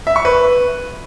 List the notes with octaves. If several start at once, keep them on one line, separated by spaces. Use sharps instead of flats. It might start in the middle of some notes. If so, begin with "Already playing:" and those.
E5
C#6
B4